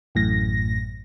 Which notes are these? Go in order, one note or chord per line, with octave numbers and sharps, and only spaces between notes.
A1 F#2 A2 A#6